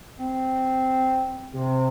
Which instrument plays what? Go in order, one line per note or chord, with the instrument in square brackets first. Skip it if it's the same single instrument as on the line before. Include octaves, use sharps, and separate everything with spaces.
[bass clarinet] C4
[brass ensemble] C3